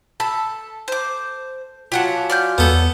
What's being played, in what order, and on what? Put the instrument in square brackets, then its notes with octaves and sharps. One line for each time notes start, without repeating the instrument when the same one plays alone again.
[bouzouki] A4 [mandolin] A5 B5
[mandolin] C5 D6
[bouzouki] F#3 C#4 F4 [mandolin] G4 F#5 A5
[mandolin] D5 F6 G6
[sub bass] E2 [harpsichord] B3 A4